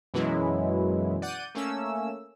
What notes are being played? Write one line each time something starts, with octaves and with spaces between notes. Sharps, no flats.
F#2 B2 E3 F#3 G#3 E4
D5 F#5 G6 D#7
A3 A#3 C#4 E6